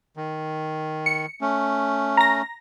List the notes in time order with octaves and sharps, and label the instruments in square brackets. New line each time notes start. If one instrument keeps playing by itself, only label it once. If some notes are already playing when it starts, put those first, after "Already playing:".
[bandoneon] D#3
[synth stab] C#7
[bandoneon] A3 C#4
[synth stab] A#5 A#6